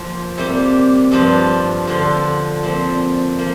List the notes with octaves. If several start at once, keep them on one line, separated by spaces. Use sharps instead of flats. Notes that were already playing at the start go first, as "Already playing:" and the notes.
Already playing: F3 A#3 F4
C3 G3 A#3 G4
G2 F3 D4 F4
D3 F3 D4 F4
A#2 F3 C4
F3 A#3